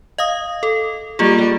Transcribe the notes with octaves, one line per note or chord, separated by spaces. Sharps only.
D#5 F5 D#6
A4
G3 A#3 F4 G#4